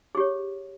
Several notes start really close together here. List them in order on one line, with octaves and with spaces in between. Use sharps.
G#4 G4 C#5